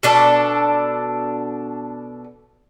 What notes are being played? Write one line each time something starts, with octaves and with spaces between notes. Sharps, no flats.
B2 D4 A4